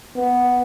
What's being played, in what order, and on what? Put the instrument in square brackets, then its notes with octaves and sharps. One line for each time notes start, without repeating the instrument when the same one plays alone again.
[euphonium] B3